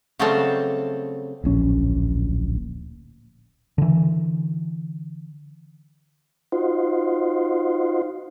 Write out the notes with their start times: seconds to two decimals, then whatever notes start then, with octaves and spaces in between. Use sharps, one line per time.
0.19 C#3 F#3 G3 A3 C4 A4
1.44 D1 A#1 C#4
3.78 D3 E3
6.52 D#4 F4 F#4 C5